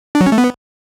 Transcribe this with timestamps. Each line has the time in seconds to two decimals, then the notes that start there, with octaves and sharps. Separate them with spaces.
0.15 D4
0.21 F#3
0.26 C#4
0.32 A3
0.38 B3